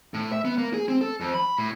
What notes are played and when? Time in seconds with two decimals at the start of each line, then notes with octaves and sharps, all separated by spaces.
0.14 A2
0.32 E5
0.45 B3
0.58 A#3
0.74 G#4
0.88 C4
1.01 A4
1.20 F2
1.34 B5
1.58 A2